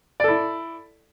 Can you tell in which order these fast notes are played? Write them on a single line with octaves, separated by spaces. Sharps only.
D5 A4 E4